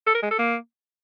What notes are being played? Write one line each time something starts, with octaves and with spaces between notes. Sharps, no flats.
A4
A#4
G#3
A4
A#3